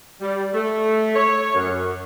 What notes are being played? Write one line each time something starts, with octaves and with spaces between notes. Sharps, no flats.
G3
A3
C#5
F#2